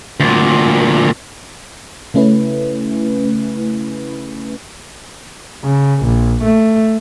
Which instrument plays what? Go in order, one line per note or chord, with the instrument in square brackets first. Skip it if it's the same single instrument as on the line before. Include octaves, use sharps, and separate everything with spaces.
[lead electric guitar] D2 A#2
[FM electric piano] C#3 A3 C#4 E4 B4
[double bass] C#3
A#1
A3